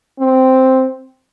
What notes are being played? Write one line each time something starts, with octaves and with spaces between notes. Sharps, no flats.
C4